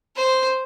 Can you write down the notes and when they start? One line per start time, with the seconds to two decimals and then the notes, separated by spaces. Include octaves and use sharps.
0.16 C5